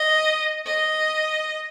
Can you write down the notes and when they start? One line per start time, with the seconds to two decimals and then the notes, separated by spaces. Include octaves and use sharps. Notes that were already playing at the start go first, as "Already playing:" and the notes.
Already playing: D#5
0.66 D#5